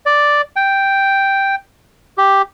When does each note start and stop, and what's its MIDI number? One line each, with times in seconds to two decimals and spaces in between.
0.06 0.41 74
0.56 1.55 79
2.18 2.42 67